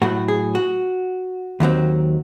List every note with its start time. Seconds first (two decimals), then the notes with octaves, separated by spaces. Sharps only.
0.02 A2 F#3 A3 F#4
0.28 G#4
0.55 F#4
1.60 D#2 D#3 F#3 C4